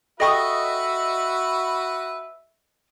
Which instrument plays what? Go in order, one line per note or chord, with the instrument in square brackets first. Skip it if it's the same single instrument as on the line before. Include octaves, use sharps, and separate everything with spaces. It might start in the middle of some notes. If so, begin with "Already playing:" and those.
[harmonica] F#4 B4 [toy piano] A4 G5 [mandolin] D#5 C#6 D#6 [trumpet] E5